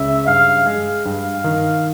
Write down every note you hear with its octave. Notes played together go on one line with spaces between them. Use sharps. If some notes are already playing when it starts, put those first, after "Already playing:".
Already playing: C#2 C#3 E5
G2 F5
G#3
G2 F5
D#3